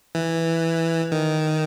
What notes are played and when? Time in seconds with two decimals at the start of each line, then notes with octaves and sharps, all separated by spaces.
0.15 E3
1.12 D#3